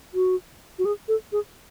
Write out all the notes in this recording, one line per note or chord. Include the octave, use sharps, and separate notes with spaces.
F#4
F#4
G#4
A4
G#4